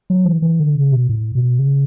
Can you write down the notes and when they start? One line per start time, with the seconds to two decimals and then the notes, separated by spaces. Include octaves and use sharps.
0.10 F#3
0.26 E3
0.42 E3
0.60 D3
0.75 C#3
0.92 B2
1.09 A2
1.35 B2
1.59 C#3